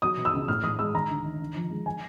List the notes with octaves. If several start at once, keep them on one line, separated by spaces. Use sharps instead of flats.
F#3 D#6
B2
E6
C#2
A2 F6
A2 D#6
G#3 E6
D#3 A#5
D2
D#3
D3
F3
G#3
G#5